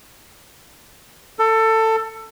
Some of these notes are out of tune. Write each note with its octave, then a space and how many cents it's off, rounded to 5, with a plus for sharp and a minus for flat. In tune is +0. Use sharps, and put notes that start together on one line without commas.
A4 +20